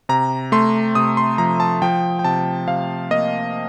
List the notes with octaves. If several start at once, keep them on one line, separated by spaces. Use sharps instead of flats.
C3 A#5
A3 C6
C3 D#6
C6
F3 A#5
A5
F3 G5
G5
C3 A5
C3 F5
A#3 D#5